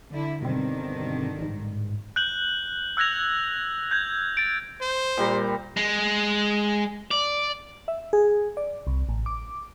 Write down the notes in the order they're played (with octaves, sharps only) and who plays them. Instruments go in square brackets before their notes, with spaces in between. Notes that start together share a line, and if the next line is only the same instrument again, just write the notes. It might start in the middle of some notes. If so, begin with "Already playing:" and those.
[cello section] D3 E4
[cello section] G2 D3 D#3 [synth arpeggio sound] B2 C4
[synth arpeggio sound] A1 G#2
[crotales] F#6 G6 F#7
E6 F#6 G#6 A#6 F7
G6 G#6
A6 D7
[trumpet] C5
[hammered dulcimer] A#2 G3 A#5
[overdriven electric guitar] G#3
D5
[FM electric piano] E5
G#4
D5
C2
A1
D6